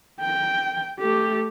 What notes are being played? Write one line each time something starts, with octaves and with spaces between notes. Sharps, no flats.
G5
A3 G4